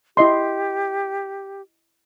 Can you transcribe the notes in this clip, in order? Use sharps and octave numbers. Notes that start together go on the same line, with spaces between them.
E4 G4 D#5 C6